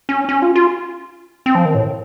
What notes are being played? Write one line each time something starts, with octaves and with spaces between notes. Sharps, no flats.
C#4
C#4
F4
F4
C4
F3
D#3
A2